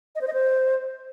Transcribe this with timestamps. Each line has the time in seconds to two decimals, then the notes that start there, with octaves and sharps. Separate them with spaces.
0.15 D#5
0.21 C5
0.27 D#5
0.33 C5